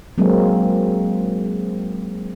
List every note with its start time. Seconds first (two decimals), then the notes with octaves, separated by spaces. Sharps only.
0.18 F#3 G#3 A#3 C4